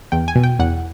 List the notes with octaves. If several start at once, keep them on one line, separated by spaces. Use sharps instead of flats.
E2 G5
G#5
B2
G5
E2 F#5